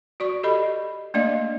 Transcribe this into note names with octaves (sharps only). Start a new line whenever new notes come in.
F#4 D5 C#6
G4 A4 D#5 B5
A3 A#3 D4 D5 D#5 F5